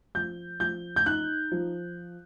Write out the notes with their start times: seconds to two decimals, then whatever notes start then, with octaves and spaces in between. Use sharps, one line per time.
0.15 F3 G6
0.60 F3 G6
0.96 G6
1.06 D#4 F#6
1.52 F3